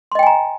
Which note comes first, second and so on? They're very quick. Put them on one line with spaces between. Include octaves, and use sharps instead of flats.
C6 D#5 G5 G#5 A#5